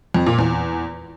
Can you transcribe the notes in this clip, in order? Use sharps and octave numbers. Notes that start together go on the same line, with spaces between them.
F2
A#2
E2